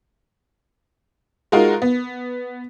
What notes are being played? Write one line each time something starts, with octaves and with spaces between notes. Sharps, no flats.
G#3 D#4 F4 F#4 A#4
B3